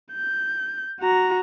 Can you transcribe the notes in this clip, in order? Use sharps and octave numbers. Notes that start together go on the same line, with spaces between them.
G6
F#4 A#5